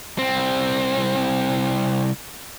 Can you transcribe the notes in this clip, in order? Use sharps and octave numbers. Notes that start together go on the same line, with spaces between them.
C2 C4